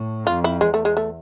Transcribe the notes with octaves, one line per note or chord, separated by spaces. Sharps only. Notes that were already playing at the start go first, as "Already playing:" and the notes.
Already playing: A2
F2 F4
E4
E2 G#3
A3
G#3
A3